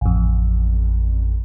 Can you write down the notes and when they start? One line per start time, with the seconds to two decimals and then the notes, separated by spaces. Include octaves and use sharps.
0.01 A1 F2